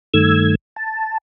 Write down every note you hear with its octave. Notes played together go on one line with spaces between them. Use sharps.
G2 D#3 A3 E6 G#6
A5